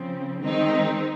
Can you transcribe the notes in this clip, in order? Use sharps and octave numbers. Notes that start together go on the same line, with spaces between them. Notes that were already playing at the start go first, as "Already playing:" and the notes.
Already playing: C#3 F3 C4
D#3 G#3 C4 D#4